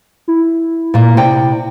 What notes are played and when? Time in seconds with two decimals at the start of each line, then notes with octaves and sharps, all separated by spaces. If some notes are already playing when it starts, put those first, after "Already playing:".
0.28 E4
0.94 A#2 A#3
1.17 C3 D5 G5